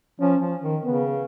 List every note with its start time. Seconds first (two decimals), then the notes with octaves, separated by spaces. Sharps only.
0.20 F3 C#4
0.41 F3
0.62 D#3
0.84 C#3 B3